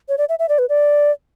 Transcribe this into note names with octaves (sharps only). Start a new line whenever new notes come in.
C#5
D5
E5
E5
D5
B4
D5